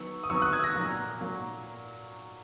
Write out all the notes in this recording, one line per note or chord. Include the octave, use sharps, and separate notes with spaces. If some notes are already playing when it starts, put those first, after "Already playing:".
Already playing: D#3 F#3 B3 C#6 E6
D#6
D#3 F#3 B3 C#6 E6
D#6 F#6
E6 G#6
F#6 A#6
A#2 F#3 A#3
A#2 F#3 A#3